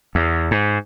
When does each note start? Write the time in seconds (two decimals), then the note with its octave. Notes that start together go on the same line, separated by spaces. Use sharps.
0.15 E2
0.51 G#2